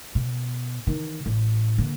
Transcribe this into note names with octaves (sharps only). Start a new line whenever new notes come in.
B2
D#3 E3
A1
D3 A#3